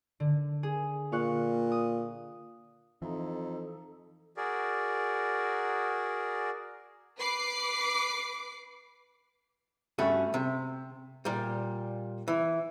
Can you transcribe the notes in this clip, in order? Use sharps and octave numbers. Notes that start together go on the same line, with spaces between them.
D3
G#4
A#2 F5 C#6 F#6
D#6
F2 E3 D#4 A4
F#4 G#4 A#4 D5
B4 D6 C7
G2 A3 C#4 F#4
C3
A#2 G3
E3